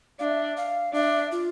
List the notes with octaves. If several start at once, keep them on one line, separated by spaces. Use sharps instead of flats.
D4 E5 F5
F5
D4 E5
F4